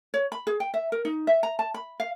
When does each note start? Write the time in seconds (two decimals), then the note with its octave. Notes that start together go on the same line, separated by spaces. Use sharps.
0.14 C#5
0.32 B5
0.47 G#4
0.60 G5
0.74 E5
0.92 A#4
1.05 D#4
1.27 E5
1.43 A#5
1.59 A5
1.74 B5
2.00 F5